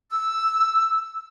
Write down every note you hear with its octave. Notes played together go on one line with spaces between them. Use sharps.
E6